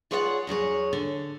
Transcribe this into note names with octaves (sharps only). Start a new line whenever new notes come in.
F4 G#4 C#5 D5 F5 F#5
E2 F#3 G#4 C#5
D3